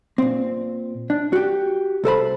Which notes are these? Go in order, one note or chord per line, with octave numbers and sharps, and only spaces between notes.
A#2 C4
D4
F#4 G4
C2 A4 C5 B5